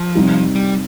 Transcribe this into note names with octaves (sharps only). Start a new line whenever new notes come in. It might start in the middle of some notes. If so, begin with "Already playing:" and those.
Already playing: F3
C3 G3 D#4 G4
G3